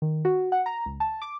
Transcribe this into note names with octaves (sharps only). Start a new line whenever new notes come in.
D#3
F#4
F#5
A#5
C#2
A5
D6